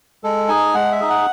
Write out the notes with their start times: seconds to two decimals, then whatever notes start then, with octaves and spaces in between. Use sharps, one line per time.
0.24 G#3 A4
0.49 D#4 G#4 G#5
0.74 G#3 F#5
0.91 E5
1.00 D#4 G#4
1.10 F#5